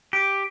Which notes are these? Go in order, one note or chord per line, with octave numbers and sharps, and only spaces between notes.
G4